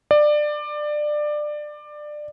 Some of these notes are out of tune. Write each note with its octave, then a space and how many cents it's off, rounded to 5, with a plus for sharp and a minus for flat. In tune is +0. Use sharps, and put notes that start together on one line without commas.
D5 +20